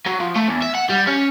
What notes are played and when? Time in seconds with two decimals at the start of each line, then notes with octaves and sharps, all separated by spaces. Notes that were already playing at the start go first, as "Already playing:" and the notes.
0.06 F#3
0.20 F3
0.36 A3
0.48 E2
0.62 E5
0.75 F#5
0.90 G3
1.07 C#4